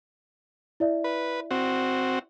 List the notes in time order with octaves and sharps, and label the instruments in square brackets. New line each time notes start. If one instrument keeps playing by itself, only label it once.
[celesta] E4 D5 E5
[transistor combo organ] B4
C4 F#4